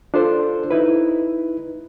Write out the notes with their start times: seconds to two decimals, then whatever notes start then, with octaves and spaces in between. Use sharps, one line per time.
0.14 D4 F4 A4 C5
0.71 D#4 E4 B4